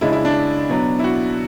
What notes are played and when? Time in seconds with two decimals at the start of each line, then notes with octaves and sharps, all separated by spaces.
0.01 C#3 G#3 D4 E4
0.13 E4
0.25 D4
0.69 B2 F#3 B3 D4
0.99 E4
1.04 F#4